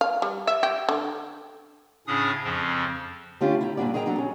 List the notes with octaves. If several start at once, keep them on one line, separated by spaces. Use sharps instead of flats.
F5
G3
E5
G4
D3
A2 C#3 C#4 D4 G#4 D#6
F2 C#3 F3 C4
D3 A3 C#4 D4 F4 G4
E4 G#5 A#5
G2 A#2 E3 D4 F#4 D5
G#4 A#4 D#5 G5 A#5
A#2 F#3 D4 A4 A#5
C#4